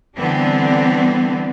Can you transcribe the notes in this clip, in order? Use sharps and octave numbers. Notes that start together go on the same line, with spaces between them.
D3 E3 G3 B3 C4 D4